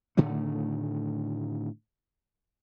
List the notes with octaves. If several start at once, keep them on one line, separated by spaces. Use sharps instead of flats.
A2 D3 D#3 A3